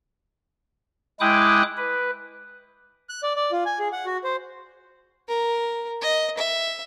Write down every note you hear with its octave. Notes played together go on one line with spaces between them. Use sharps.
G#3 E4 G5 D6 D#6 F#6
B4
F#6
D5
D5
F4
G#5
G#4
F#5
F#4
C5
A#4
D#5
E5